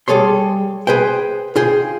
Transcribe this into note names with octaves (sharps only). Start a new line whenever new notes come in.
G3 G#4 A4 C#5 C6
G#4 B4 C5 G5
F4 G#4 G5